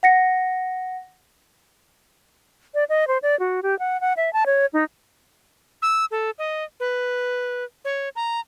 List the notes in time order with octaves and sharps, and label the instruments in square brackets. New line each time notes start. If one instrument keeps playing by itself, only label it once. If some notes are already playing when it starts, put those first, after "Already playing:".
[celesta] F#5 A#6 C#7
[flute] D5
D#5
C5
D5
F#4
G4
F#5
F#5
E5
A5
C#5
D#4
[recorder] E6
A4
D#5
B4
C#5
A#5